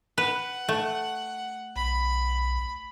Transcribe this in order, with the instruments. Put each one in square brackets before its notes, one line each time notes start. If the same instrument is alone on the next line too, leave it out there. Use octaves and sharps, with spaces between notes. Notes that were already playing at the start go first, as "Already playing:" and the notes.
[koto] B4 [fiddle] F#5
[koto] A3
[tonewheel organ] B1 [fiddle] B5